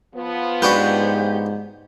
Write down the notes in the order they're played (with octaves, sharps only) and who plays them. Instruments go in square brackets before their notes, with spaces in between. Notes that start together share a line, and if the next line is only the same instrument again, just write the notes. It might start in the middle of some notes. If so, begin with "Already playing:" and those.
[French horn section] F3 B3
[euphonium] G#2 [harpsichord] D4 F#4 B4 [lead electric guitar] G4